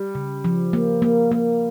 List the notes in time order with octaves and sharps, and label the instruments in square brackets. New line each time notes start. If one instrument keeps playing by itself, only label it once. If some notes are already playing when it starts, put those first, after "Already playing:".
Already playing: [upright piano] G3
[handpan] C#3
F3
A#3
A#3
A#3